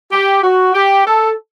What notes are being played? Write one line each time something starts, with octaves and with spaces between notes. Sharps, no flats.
G4
F#4
G4
A4